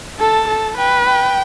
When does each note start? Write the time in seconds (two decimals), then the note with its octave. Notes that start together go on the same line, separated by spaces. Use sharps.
0.19 A4 A5
0.48 A4
0.77 B4 G5
1.06 G5